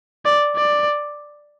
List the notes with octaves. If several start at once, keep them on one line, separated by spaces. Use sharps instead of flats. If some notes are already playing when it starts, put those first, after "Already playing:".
D5
D5